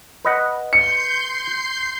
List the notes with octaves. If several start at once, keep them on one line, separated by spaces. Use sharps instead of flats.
B4 D#5 F#5
C6 G6 C7 C#7